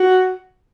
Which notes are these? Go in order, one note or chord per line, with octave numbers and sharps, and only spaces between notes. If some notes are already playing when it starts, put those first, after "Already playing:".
Already playing: F#4